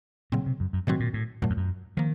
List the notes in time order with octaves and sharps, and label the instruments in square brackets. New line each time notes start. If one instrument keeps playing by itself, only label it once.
[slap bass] A#2 [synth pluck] C#3 F#3 C4
[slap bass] C3
F#2
F#2
[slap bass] A2 [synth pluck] C3 D#3 F#3 C4 F#4
[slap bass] A#2
A2
[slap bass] F#2 [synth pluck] A#2 F#3 A3
[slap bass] F2
F#2
[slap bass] D#3 [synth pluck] F3 A#3